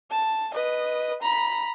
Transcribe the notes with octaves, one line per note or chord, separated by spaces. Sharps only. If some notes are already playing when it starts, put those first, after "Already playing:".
A5
B4 D#5
A#5 B5